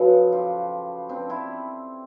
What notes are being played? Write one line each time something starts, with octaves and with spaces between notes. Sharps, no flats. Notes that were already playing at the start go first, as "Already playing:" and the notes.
Already playing: F#2 C#3 F3 A4 B4
F4 G4
C4 D4
D4 E4